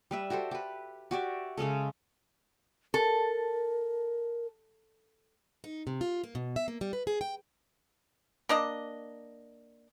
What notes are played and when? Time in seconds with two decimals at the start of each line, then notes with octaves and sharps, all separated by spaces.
0.11 G3 B4 E5
0.30 F#4 G4 A4 C5
0.51 G4 B4
1.11 F#4 G4 D5 E5
1.57 C#3 G#3 C#4 A4
2.94 A4 A#4
5.64 D#4
5.87 C3
6.01 F4
6.24 A#3
6.35 B2
6.56 E5
6.68 A#3
6.81 G3
6.93 B4
7.07 G#4
7.21 G5
8.49 A#3 D4 D#5